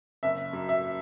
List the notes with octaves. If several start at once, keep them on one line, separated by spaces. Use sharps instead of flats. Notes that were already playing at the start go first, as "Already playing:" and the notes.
F#1 E5
F#2
E5